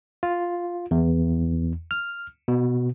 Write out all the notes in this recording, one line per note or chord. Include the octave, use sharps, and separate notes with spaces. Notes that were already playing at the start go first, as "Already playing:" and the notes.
F4
E2
F6
B2